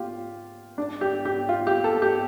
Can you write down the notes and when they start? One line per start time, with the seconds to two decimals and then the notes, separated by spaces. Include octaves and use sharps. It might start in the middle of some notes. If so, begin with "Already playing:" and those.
Already playing: F4 G4
0.78 D4
1.01 G4
1.25 G4
1.49 F4
1.67 G4
1.84 A4
2.02 G4